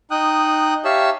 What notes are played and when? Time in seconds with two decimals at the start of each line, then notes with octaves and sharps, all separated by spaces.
0.11 D#4 G5 D#6 F#6
0.85 G4 C#5 E5 F5 A5 E6